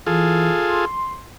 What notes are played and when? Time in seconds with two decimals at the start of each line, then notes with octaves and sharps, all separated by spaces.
0.07 E3 F4 G#4 A4
0.68 C6